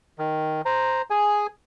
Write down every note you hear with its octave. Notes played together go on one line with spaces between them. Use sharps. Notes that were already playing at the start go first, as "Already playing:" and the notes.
D#3
C5 A#5
G#4 G#5